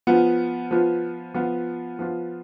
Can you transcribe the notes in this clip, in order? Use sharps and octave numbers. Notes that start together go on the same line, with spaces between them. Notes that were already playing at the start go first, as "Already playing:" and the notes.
F3 B3 F4
F3 B3 F4
F3 B3 F4
F3 B3 F4